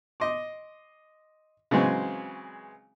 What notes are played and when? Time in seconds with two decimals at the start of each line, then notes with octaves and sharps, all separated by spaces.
0.20 D#5 C6 D6
1.71 C#3 E3 F#3 G#3 C4